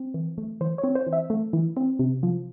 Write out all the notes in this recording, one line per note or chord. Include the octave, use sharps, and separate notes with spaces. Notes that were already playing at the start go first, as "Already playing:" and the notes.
Already playing: C4
E3
A3
E3 C5
C#5
C4
C5
E3
E5
A3
E3
C4
C3
F3